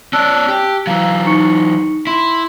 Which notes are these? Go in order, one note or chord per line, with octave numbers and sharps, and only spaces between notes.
C#4 D5 A5 E6 F#6
G4
E3 F#3 F5 A#5 E6
D#4 C#6 C#7
E4 C6